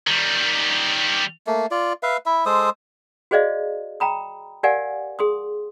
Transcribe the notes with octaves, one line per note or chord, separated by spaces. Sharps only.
D#3 G3
A3 A#3
F4 D5
B4 E5 F5
E4 E5
G#3 A4 C5 D#6
F#4 G#4 C5 D5 D#5 F5
G5 A#5 B5 D#6
G4 A#4 D5 F5 F#5 G#5
G#4 C6 D#6